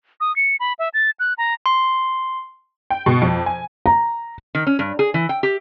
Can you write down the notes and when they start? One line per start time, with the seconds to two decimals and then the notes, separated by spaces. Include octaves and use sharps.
0.21 D#6
0.36 C#7
0.60 B5
0.79 E5
0.94 A6
1.20 F#6
1.38 A#5
1.66 C6
2.90 G5
3.06 B2
3.22 F2
3.46 G#5
3.86 A#5
4.55 D#3
4.67 C#4
4.79 G2
4.99 G#4
5.14 E3
5.29 G5
5.43 G4